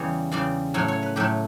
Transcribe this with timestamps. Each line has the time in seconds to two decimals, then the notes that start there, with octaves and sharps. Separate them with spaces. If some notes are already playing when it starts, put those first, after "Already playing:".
Already playing: E2 C#3 G3 C#5
0.32 E2 C#3 G3 D5
0.74 A2 F#3 A3 C#5
0.88 C#5
1.03 B4
1.16 A2 F#3 A3 G4